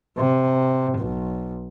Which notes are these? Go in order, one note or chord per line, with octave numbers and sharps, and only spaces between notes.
C3
B1